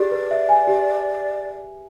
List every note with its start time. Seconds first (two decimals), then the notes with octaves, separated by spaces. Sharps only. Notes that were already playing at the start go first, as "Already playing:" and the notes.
Already playing: G4 G#4 D5
0.11 B4
0.31 E5
0.49 G#5
0.68 G4